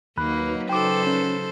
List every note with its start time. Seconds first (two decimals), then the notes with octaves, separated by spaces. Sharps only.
0.17 D#2 F#3 A#3 D#4 B4 B5 F#6
0.69 C#3 A4 C5 G5 D6
1.07 C#4